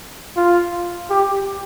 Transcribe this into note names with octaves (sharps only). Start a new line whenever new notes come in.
F4
G4